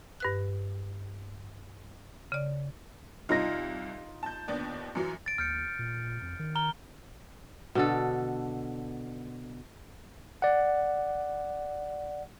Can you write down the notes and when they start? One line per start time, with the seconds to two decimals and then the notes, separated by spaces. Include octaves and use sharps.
0.20 G2 B4 F#6
2.32 C#3 D5
3.29 C2 D#4 F4 F6 A#6
4.23 A5 G6
4.48 D#2 B3 D4
4.95 F#2 E3 F#3
5.26 D1 A6 D7
5.38 D#2 F6 G6 C#7
5.79 A#2
6.22 F2
6.39 D#3
6.55 A#5 F6 G7
7.75 B2 D3 A4
10.42 D5 F#5